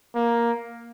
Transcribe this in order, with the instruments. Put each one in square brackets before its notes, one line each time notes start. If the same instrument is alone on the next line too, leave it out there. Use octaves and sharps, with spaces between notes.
[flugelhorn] A#3